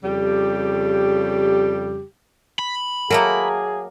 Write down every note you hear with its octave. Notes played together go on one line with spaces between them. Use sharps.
F2 C#3 G3 G4
B5
F#3 A3 A#3 G#4 A#4